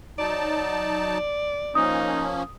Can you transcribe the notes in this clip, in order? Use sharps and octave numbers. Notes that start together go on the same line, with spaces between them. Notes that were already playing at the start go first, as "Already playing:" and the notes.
F#3 D#4 D5 A5
F3 A#3 C#4 D#4 D#6